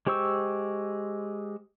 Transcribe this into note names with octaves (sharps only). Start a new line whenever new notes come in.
G#3 G4 C5 C#6 E6